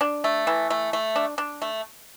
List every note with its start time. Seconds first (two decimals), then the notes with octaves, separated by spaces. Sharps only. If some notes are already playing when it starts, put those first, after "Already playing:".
0.01 D4
0.24 A3
0.47 E3
0.70 A3
0.93 A3
1.16 D4
1.38 D4
1.62 A3